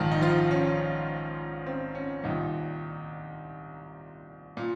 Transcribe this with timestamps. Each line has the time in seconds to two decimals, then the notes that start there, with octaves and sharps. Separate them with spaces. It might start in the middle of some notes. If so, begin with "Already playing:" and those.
Already playing: A#1 G#2 D#3
0.11 D#4
0.21 F3 F4
0.51 C#4
1.66 C4
1.95 C#4
2.23 C2 A#2 D#3 D#4
4.57 A#2